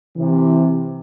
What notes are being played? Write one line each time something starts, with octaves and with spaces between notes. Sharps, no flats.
C3 E3